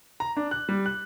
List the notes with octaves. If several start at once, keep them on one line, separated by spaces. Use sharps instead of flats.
A#5
D4
F#6
G3
F#6